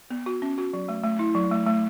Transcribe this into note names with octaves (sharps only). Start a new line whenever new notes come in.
B3
F#4
C#4
F#4
F#3
A3
A3
E4
F#3
A3
A3